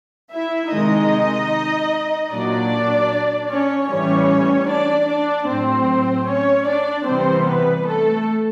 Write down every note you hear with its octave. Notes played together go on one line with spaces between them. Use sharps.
E4 E5
C3 D#3 G#3 D#4 D#5
A#2 F#3 D4 D5
C#4 C#5
A2 E3 G3 C#4 C#5
D4 D5
D4 D5
A2 F#3 C4 C5
C#4 C#5
D4 D5
C3 E3 G3 C4 C5
B3 B4
A3 A4